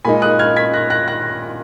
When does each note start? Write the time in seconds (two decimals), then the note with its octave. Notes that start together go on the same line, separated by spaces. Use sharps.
0.05 A#2 G#3 D#4 G#5 B5
0.22 D#6 F#6
0.39 F6 G#6
0.56 G#6 B6
0.74 F#6 A#6
0.90 F#6 A#6
1.08 F#6 A#6